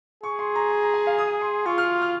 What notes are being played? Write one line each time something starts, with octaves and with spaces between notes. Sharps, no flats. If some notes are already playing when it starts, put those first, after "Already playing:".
G#4 C#6
C6
A#5
C6
A#5
G#5
F5
D#6
C6
F4 C#6
F6
F6